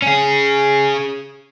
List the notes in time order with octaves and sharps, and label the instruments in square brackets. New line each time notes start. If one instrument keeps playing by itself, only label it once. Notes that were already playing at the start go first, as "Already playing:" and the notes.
[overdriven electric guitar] C#4 G#4